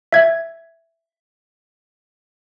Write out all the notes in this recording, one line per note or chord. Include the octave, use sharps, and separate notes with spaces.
E5 G#6